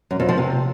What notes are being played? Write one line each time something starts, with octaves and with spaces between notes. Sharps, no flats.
F#2
F2
F3
C3